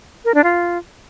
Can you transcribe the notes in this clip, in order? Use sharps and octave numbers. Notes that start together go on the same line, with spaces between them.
A#4
D4
F4